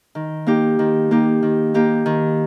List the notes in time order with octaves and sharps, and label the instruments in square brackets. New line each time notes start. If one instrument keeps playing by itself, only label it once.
[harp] D#3
A#3 D#4 G4
D#3
A#3 D#4 G4
D#3
A#3 D#4 G4
D#3